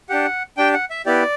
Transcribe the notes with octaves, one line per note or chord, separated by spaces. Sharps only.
D4 G4 F#5
D4 G4 G5
F#5
E5
B3 E4 G4 D5